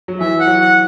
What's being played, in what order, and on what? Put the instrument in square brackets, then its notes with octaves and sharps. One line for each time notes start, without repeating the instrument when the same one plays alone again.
[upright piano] F#3
[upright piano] E3 [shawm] E5
[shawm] F#5
[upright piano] F#3
[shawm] F#5